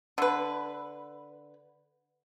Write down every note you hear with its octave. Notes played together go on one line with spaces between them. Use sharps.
D3 B4